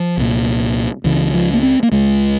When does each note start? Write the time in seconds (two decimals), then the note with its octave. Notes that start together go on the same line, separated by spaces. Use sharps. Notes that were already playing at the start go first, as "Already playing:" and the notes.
Already playing: F3
0.17 C2 A#2
1.04 C#2 C#3 E3
1.34 F3
1.53 A#3
1.63 C4
1.83 A#3
1.92 C#2 C#3 G#3